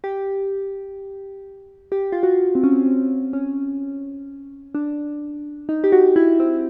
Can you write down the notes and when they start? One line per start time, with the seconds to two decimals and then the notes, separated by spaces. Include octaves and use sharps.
0.04 G4
1.92 G4
2.12 F4
2.23 F#4
2.55 C4
2.64 C#4
2.72 C4
2.86 C4
3.33 C#4
4.75 D4
5.69 D#4
5.84 G4
5.92 F#4
6.16 E4
6.40 C4